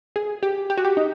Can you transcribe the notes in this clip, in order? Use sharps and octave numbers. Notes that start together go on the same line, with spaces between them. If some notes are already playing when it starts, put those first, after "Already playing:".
G#4
G4
G4
F#4
G4
D#4